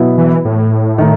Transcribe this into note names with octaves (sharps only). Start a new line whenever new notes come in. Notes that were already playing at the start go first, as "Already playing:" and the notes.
Already playing: B2 F#3 B3 E4
E3
A2
D#3 A3 D#4